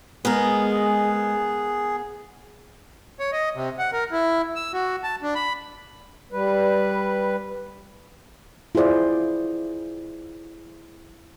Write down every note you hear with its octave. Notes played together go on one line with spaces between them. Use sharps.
G#3 B3 G#4 A#4
C#5
D#5
C3
F#5
A#4
E4
E6
F#4
A5
D4
B5
G3 B4
E4 F4 G#4 C5 D5